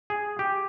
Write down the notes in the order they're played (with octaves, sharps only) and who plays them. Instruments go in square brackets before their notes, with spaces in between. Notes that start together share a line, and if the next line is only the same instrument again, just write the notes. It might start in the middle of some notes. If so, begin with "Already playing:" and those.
[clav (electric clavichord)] G#4
G4